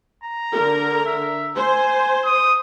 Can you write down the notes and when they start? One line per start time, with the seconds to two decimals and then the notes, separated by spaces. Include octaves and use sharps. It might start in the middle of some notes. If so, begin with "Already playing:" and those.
0.24 A#5
0.54 D3 A#4
1.06 E5
1.56 C5 G#5
2.25 D#6